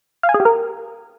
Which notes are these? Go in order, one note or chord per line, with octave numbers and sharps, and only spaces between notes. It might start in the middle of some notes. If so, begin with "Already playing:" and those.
F5
G#5
G#4
G4
A#4